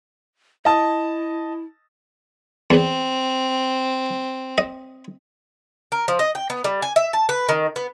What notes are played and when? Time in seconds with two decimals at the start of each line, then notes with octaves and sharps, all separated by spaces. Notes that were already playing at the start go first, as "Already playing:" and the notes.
0.65 E4 D#5 A5
2.70 E2 C4
4.58 D#5
5.92 A#4
6.08 F3
6.19 D#5
6.35 G5
6.50 B3
6.64 G3
6.82 G#5
6.96 E5
7.13 A5
7.29 B4
7.49 D#3
7.76 B3